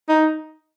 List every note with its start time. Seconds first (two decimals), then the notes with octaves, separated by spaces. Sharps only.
0.08 D#4